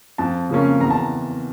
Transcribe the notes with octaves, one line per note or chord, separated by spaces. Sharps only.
F2 A5
C#3 F3 A#3 C#4
E2 A#5
A5